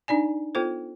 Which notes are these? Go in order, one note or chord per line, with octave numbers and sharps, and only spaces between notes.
D4 D#4 D5 G#5
B3 F4 A4 C5